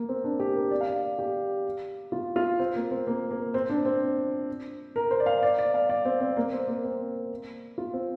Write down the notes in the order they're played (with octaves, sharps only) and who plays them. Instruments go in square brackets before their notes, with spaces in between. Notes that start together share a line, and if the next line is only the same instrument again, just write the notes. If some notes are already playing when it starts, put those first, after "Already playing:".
Already playing: [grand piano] A#3
C4
D4
G4
A#4
D5
F5
D5
G4
F4
F4
C4
A#3
C4
A#3
A#3
C4
D4
C4
A#4
C5
D5
F5
D5
D5
F5
D5
C4
C4
A#3
C4
A#3
C4
F4
C4